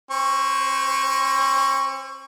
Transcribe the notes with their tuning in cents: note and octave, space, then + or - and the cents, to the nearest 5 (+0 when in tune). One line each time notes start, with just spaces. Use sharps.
C4 +45 C5 -15 C#6 +0